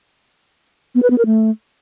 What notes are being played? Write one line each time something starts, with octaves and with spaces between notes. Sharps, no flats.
B3
B4
B3
A#4
A3